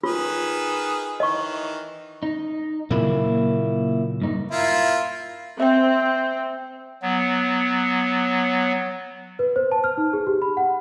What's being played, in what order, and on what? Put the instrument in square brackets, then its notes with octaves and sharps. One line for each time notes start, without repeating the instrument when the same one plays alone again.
[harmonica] D#3 G#4 B4 [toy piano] F4
[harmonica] D#3 E3 [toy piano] D#5 C#6
[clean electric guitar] D#4
[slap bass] A#2 C#3 F#3 [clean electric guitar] A#3 E4
[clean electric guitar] G2 D#4
[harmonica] A#3 E4 F4
[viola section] C4 [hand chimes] E5 G5
[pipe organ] F#3 B3
[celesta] B4
C5
A5
F6
D#4
G#4
G4
B5
F#5